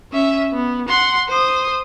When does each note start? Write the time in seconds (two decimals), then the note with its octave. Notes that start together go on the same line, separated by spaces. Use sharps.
0.12 C#4 E5
0.53 B3
0.89 F#5 C6
1.28 C5 D#6